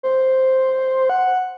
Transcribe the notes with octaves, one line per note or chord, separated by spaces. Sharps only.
C5
F#5